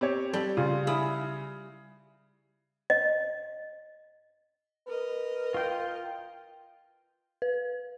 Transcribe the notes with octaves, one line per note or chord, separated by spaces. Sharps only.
C4 G4 C#5
G3 A4
C#3 F4
E4 G#4 D#6
D#5
A#4 B4 D#5
F4 G5
B4